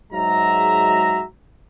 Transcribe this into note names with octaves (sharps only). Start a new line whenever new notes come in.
G#2 F#3 G#3 F#4 E5 A#5